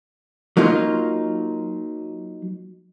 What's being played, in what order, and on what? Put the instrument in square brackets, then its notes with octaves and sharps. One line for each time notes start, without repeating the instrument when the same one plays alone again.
[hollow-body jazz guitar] F#3 A#3 D#4 F4